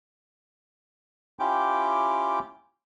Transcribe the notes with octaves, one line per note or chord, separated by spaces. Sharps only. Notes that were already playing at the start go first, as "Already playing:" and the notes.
C#4 E4 F4 G4 G5 D6